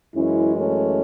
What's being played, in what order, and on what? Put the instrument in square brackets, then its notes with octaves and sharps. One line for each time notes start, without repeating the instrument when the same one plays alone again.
[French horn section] F#2 E3 G#3 C#4 E4
A3 C#4